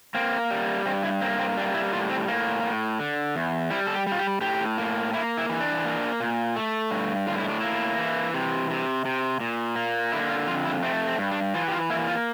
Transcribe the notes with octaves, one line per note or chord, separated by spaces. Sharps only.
A#3 C4
G3
G2 C4
E4
A#3 C4
C4
G3 D4
E4
A2 F4
C4
A2 A#3
A2
D3
E2
G3 E4
A4
G4
G3
F4
G4
A2 G4
A#3
A#3 E4
E4
E3
D4
A#3
A#2
A3
G2
A2 F4
E4
D4
A#3 E4
E3
C3
C3
C3
A#2
A#3
D3 E4
F4
F2 F4
E4
A3 C4
C4
G2
D4
E3 F4
G4
F4
A#3 E4
F4